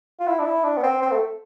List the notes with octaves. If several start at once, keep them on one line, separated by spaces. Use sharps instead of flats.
F4
E4
D4
E4
D4
B3
C4
C4
A3